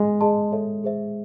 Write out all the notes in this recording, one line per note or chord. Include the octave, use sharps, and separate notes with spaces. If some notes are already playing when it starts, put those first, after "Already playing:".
Already playing: G#3
G#4 D#5 A5 C6
A4 C#5 E5
G#4 C5 E5